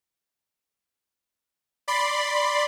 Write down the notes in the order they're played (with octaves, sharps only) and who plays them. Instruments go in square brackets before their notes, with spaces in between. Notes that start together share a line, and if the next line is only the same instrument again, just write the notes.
[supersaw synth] D5 B5 C6